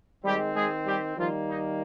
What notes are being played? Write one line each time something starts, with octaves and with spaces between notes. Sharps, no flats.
D#3 G3 G#3 C4 G4
G#3 G#4
G3 G4
D#3 F3 G3 A#3 F4
D#4